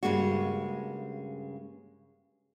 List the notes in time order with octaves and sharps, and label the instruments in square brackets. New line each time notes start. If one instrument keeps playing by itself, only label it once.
[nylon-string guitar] G2 A#2 C#3 G#3 A#3 F#4